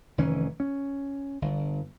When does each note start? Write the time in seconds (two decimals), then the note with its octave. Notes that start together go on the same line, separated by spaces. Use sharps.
0.18 F1 D#3 E3 C#4
0.60 C#4
1.42 G1